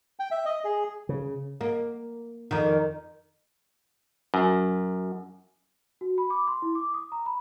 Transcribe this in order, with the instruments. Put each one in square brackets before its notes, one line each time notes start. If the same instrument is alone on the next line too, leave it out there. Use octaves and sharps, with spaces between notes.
[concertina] G5
E5
D#5
G#4
[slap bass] C#3
[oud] A#3
F2 D#3
[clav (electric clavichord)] F#2
[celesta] F#4
B5
D6
C6
E4
D6
D#6
A#5
B5